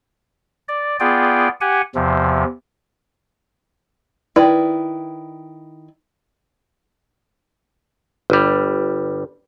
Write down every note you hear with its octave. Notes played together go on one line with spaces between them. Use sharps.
D5
B3 F4 G#4 D5 G5
G4 F#5 G#5
E2 C3 F3
D#3 E4 B4 D5
G1 G3